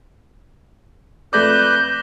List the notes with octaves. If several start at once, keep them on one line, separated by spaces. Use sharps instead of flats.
F2 A3 B4 D5 D6 F#6 G6 A#6